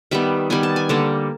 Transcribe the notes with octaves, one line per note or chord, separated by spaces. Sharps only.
D#3 G3 B3 E5
D#3 G3 B3 G#5
A5
G#5
D3 G3 A#3 A5